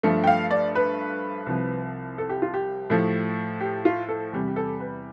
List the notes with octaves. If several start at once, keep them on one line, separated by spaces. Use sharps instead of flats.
G2 F3 A3
G5
F5
D5
B4
C2 C3 F3
A4
G4
F4
G4
A2 F3 A3
G4
F4
A4
E2 C3 G3
G4
A4
B4